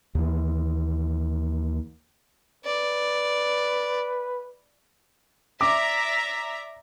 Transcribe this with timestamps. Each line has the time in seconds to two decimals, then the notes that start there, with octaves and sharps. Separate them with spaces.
0.15 D#2 E3
2.65 B4 D5
5.61 D5 E5 A#5 D6